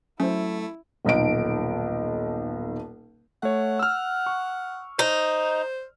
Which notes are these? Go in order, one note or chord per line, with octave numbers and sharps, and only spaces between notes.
F#3 A3 C#4 E4 C5
D#1 B1 D#4 D7
A3 C#5 F#5
E6 F6
C#6
D#4 C5